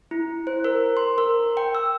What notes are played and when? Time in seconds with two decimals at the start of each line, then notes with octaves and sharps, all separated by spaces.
0.11 E4
0.47 C5
0.64 A#4
0.97 C6
1.18 A#4
1.57 G5
1.75 E6